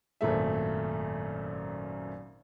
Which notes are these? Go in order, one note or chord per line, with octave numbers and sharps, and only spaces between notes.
G#1 F#2 A#2 A3 E5